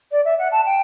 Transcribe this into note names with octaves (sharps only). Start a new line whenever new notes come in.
D5
E5
F#5
A5
G5